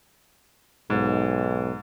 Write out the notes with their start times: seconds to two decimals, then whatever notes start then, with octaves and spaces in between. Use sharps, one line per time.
0.90 B1 G#2